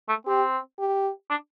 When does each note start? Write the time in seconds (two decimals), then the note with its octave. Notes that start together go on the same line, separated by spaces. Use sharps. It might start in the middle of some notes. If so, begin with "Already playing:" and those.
0.09 A3
0.27 C4 G4
0.79 G4
1.30 D4